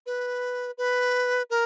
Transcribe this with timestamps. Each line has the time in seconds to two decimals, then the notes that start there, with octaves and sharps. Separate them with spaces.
0.06 B4
0.78 B4
1.50 A#4